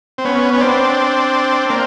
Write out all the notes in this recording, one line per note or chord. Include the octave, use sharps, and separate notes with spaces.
C4
B3 C#4
C#4
C4 D4
A#3 C4